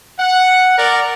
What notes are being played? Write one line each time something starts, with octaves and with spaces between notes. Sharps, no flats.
F#5
A#4 D5